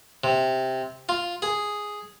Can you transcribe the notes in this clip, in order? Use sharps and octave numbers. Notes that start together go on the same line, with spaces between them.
C3
F4
G#4